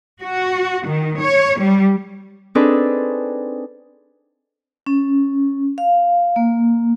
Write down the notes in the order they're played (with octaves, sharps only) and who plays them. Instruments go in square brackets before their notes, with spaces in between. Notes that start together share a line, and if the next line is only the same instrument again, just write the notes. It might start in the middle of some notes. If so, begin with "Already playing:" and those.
[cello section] F#4
D#3
C#5
G3
[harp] C4 D4 D#4 G#4 A4 B4
[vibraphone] C#4
F5
A#3